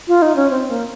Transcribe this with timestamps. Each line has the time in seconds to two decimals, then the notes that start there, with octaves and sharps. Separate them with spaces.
0.08 F4
0.22 D#4
0.36 C#4
0.51 C4
0.69 A#3